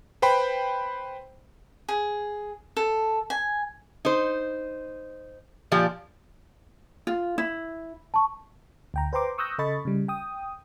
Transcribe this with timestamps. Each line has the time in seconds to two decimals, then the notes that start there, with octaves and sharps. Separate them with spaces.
0.22 B4 C5 G5 B5
1.88 G#4
2.77 A4
3.30 G#5
4.05 D#4 C5
5.72 A#2 F3 G4 D5
7.07 F4
7.38 E4
8.14 A5 C#6
8.94 D2 G5 A#5
9.13 B4 C5 G5 A#5 C6 D6
9.38 C#6 D#6 E6 F#6 G6 A#6
9.58 C#3 A4 D#5 B5 C#6 A6
9.85 C#3 G3
10.08 G5 D#6